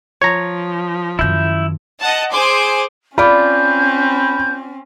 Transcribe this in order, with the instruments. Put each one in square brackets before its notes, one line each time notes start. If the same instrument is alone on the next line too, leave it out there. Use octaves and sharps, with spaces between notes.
[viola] F3 [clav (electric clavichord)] C#5 A#5
[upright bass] F#2 D#3 [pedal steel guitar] E4 G6
[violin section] D#5 F#5 A5
G#4 C5 G#5 C6 D6
[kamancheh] C4 C#4 [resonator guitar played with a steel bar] F4 D5 [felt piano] B5 [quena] G6